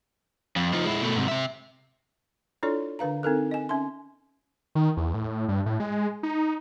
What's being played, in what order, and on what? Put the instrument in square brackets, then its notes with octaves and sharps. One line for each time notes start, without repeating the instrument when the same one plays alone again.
[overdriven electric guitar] F2
F3 D#4
G#3 E4
B2 A3
G#2 C3
C3 E5
[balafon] D4 E4 F4 A4 C#5 D5
D3 D4 B4 F5 A#5
C4 D#4 A4 A#4
D#5 G#5
C#4 E5 C6
[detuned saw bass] D#3
E2
A2
G2
A2
G#3
D#4